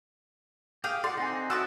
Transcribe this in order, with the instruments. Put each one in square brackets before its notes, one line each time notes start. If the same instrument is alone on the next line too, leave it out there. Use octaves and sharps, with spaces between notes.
[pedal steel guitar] G4 G#4 [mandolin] F5 G5
[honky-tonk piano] A4 F#5 [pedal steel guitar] D5 [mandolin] C6
[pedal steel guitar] C4 D#4 [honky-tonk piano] F#5 G#5
[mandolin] F#4 A5 D6 [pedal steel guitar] C#5 D#5 E5 [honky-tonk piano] E6